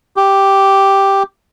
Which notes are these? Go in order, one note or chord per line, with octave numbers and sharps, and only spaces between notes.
G4